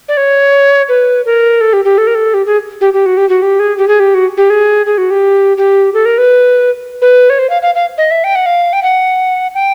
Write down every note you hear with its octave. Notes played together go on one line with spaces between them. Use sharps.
D5
C#5
B4
A#4
A4
G4
G4
A4
A#4
A4
G4
G#4
G4
G4
F#4
G4
F#4
G4
G#4
G4
G#4
G4
F#4
G4
G#4
G#4
F#4
G4
G4
A4
A#4
B4
B4
C#5
C5
F5
F5
F5
D#5
E5
G5
F#5
F5
G5
F#5
G5